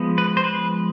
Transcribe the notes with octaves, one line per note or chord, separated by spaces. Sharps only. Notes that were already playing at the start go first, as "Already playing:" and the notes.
Already playing: F3 G#3 B3
B4
C5
B4